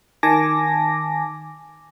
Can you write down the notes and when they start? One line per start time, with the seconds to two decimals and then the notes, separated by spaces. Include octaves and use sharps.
0.23 D#3 G#5 A5 D6 A#6